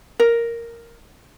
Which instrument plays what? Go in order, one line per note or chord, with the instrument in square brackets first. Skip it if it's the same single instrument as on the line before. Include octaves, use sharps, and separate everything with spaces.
[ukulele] A#4